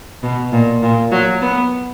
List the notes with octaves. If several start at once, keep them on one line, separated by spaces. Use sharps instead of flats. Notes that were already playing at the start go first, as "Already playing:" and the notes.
B2
A#2
A#2
F#3
B3